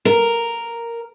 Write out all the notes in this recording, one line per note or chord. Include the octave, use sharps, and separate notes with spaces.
A#4